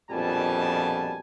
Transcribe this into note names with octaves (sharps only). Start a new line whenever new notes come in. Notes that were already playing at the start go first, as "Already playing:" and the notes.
A#1 F2 B2 G3 G#5 A5